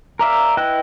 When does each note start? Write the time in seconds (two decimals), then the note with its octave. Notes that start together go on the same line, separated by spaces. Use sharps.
0.19 A#4 D5 E5 F5
0.57 E4 B4 D#5 G5 F#6